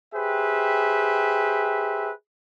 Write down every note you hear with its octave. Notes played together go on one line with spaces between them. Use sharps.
G4 G#4 B4 C5 E5 G5